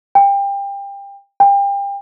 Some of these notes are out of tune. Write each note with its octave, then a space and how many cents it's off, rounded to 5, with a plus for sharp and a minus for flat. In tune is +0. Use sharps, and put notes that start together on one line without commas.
G5 +25
G5 +30